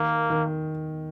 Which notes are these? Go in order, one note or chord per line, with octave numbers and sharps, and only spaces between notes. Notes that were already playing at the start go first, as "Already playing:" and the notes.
Already playing: D#3 A#3
D#3